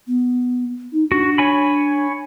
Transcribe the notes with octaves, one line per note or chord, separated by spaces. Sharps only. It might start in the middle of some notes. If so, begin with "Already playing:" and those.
B3
D#4
D4 F#4
C#5 G#5 B5